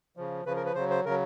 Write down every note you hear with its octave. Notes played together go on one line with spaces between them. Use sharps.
C#3 F3
C#3 F3 B4
A#4
B4
C#3 F#3 C5
C5
C#3 F#3 A#4